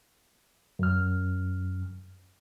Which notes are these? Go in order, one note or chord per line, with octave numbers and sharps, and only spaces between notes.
F#2 F6